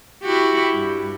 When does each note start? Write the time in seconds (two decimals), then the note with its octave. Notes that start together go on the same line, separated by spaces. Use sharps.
0.23 E4 F#4 G4
0.73 G2